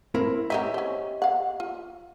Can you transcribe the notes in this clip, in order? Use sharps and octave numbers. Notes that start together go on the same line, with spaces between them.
C4 E4 A#4
E3 F#3 D#4 G4 D#5 E5
C#4 C5
F5 F#5
F4